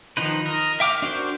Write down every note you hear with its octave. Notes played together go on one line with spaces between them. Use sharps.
D#3 F3 D#4 B4
A#4 D#5
E5 G5 D6 E6 F6
D4 F#4 A#4 C5